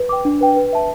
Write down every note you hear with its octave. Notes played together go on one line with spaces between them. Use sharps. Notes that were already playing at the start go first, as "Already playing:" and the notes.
Already playing: B4
G5 D6
D4
B4 G5
B4
E5 A5